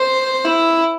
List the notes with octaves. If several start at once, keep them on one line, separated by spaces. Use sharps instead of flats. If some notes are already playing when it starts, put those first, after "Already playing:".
Already playing: C5
E4